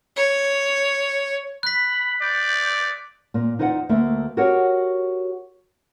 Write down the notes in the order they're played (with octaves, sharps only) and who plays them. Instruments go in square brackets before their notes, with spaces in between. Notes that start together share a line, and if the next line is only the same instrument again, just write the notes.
[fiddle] C#5
[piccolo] B5 [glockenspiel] F#6 B6
[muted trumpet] D5 [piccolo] G6
[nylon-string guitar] A#2 A#3
E2 D#4 F4 C5 D5 F#5
D2 A3 A#3 E5
F#4 G4 A#4 C#5 F#5